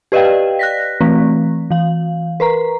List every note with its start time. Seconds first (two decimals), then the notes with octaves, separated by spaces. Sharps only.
0.12 G4 B4 D5 D#5 F5 G5
0.59 F#6 A#6 B6
1.01 E3 A3 C4
1.71 E3 F5
2.40 A#4 B4 A#5